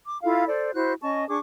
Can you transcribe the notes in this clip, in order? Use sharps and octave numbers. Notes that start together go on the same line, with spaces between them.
D6
E4 F4 A4 F5
A4 C5 D5
E4 F#4 C5 F#6
C#4 D#5 A5 C#6
D4 G#4 C#6 D6